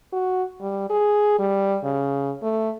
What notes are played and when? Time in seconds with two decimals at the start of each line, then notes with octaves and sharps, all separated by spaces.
0.13 F#4
0.61 G3
0.90 G#4
1.39 G3
1.84 C#3
2.42 A3